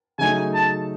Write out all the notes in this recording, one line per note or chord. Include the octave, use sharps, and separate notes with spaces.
C#3 F#3 A3 D#4 G#5
A5